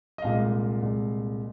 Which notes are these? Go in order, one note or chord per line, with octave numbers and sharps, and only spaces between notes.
D#5
C2 A#2 G#3 F5
C2 A#2 G#3